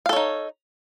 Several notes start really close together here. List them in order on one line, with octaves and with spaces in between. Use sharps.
F5 A4 C#5 D#4